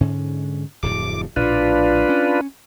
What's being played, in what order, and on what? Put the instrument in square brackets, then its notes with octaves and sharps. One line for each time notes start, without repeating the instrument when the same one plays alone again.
[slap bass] G#2 D3 C#4
[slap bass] D1 F2 A2 [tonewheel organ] D6
[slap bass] A#1 A2 [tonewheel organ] D4 F4 B4
[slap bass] C#4